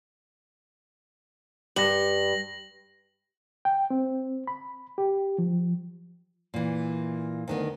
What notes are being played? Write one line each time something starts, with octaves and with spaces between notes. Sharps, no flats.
G2 A#6 F#7
G5
C4
B5
G4
F3
A#2 E3
D2 D#3 B3